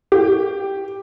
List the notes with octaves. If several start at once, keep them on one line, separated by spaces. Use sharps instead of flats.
G4